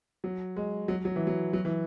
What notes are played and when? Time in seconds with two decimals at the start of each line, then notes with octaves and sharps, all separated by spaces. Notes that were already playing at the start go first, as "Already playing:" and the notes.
0.24 F#3
0.56 G#3
0.88 F#3
1.05 F#3
1.16 E3
1.27 F#3
1.53 F#3
1.65 E3